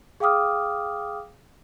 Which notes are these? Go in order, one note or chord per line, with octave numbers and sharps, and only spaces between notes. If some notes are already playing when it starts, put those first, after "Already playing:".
G#4 F5 G5 D6 D#6 F6